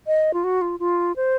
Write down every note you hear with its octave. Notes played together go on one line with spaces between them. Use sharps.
D#5
F4
F#4
F4
F4
C5